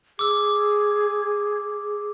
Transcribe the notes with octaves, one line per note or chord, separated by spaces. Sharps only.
G#4 D6 E6